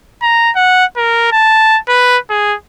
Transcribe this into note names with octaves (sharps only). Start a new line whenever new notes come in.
A#5
F#5
A#4
A5
B4
G#4